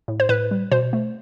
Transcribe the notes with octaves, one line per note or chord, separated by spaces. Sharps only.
A2
C5
A2 B4
G3
B2 C5
A3